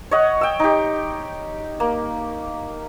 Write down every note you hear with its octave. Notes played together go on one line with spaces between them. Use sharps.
C#5 D#5 F#5
G5 E6
D#4 G4
A#3